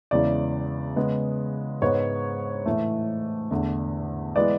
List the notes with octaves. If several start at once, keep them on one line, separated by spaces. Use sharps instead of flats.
E2 C#3 E3 G#3 D5
C#3 G#3 B3
G#2 G#3 B3 C#5
A2 E3 A3
E2 D3 A3
E3 G#3 B3 D5